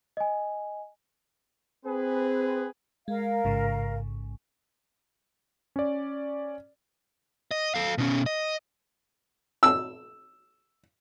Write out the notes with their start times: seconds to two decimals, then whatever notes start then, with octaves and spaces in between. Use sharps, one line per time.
0.17 D#5 G#5
1.86 C4 G#4 B4
3.08 G#3 A#4 F5
3.44 A1 G#2 C#3
5.76 C#4 D5
7.51 D#5
7.75 A4 F5
7.98 B2 C#4
8.26 D#5
9.63 E6